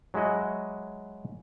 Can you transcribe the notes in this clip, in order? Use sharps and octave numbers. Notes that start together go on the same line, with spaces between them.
F#3 G#3 E4 F#4 D#5